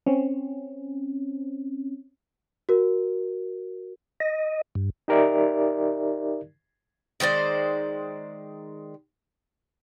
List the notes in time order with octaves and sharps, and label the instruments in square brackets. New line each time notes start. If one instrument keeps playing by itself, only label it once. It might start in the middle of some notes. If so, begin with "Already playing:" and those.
[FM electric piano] C4 C#4
[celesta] F#4 A#4
[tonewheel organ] D#5
G2
[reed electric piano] D#4 G4 A#4 D5 E5
[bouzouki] D#3 G#3 C5 D5